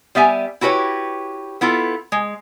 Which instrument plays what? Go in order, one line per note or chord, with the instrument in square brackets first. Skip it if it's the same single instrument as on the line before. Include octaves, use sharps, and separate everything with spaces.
[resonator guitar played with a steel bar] G3 B3 E5 G#5
E4 F#4 G4 B4 C#5
B3 E4 F4 A4
G#3